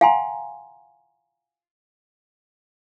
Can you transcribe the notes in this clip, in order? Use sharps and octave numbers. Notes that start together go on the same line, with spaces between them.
F5 F#5 G#5 A#5 C6